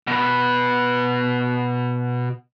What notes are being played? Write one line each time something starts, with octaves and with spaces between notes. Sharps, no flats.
B2 B4